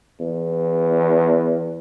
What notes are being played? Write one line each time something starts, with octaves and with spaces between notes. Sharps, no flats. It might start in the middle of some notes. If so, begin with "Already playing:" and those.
E2